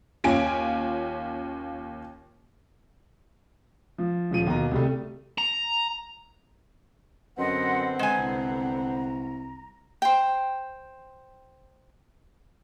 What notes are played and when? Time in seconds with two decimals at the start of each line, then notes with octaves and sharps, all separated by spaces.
0.24 D#2 C#4 F4 G#5 D7
3.98 F3
4.31 D#1 F3 D#7
4.47 D#2 B2 A#5
4.71 C2 G3 A3
5.38 A#5
7.38 F#2 D3 B3 C4 D#5 F#5 C6
7.99 G#3 G#5 A#5
8.18 C2
10.02 C5 G5